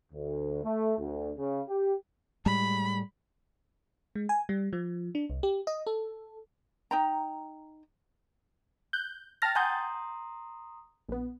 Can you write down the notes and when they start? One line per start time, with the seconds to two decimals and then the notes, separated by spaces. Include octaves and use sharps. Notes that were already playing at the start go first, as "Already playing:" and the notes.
0.13 D2
0.63 A3
0.99 D2
1.37 C#3
1.68 G4
2.46 A2 G3 G#3 B5
4.15 G#3
4.29 G#5
4.49 G3
4.73 F3
5.15 D4
5.30 C2
5.43 G4
5.67 D#5
5.87 A4
6.91 D#4 G5 A#5
8.93 F#6 G6
9.42 G5 A5 F6 A6 A#6
9.55 F#5 G#5 A#5 C6 D#6 G6
11.09 A#1 B3